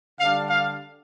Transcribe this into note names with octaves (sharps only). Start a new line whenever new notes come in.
D3 G3 D4 F5
F5